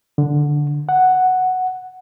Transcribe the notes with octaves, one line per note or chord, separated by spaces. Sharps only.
D3
F#5